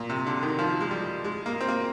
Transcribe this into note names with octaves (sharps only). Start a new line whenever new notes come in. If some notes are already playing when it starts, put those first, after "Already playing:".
Already playing: A#2
C3
D3
D#3
F3
G#3
G3
G#3
A#3
C4
A#3